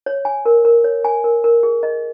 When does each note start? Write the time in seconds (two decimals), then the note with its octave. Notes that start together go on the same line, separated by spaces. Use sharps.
0.06 C#5
0.25 G#5
0.46 A#4
0.65 A#4
0.84 C#5
1.05 G#5
1.24 A#4
1.44 A#4
1.63 G#4
1.83 D#5